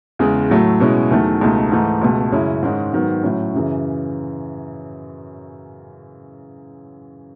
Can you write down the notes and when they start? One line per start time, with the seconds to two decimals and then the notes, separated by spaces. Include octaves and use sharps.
0.19 E2 C#3 G#3
0.50 A2 F#3 A3
0.80 B2 G#3 C#4 E4
1.11 E2 D#3 F#3 A3
1.41 C#2 B2 A3 D#4
1.72 G#2 E3 A3 D#4
2.02 C#2 B2 A3
2.32 F#2 C#3 G#3 C#4 E4
2.63 G#2 D#3 G#3 C#4
2.93 G#2 D#3 F#3 B3
3.23 A2 F#3 C#4
3.54 F#2 C#3 E3